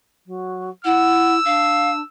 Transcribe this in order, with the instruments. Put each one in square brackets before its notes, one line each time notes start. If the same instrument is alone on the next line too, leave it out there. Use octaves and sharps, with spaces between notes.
[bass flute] F#3
[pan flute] E4 [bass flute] F#5 [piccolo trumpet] E6
[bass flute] D4 [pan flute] F5